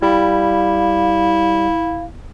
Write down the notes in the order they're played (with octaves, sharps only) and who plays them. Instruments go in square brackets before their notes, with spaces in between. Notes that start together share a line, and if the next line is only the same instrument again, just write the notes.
[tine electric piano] G3 [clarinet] E4 [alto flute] F5